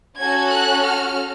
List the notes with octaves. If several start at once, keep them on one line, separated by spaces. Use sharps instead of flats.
C#4 F#4 A4 G#6
F#6
F6